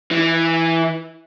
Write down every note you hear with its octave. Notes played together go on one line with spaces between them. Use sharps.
E3